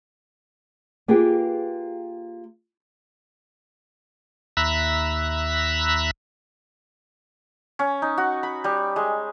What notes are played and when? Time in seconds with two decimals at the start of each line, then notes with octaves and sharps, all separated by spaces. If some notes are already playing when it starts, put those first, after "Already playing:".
1.08 A#3 F4 G4 G#4 B4 G5
4.57 D#2 E5 A#5 B5 E6 F#6
7.79 C#4
8.02 D#4
8.18 F#4
8.43 B5
8.64 G3
8.96 G#3